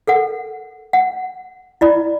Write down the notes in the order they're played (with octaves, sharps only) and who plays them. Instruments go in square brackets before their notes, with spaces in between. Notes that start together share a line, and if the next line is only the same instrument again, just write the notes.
[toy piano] A4 A#4 F#5
F#5
E4 D5 B5